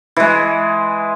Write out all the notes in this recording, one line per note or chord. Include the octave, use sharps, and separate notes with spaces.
E3 G#3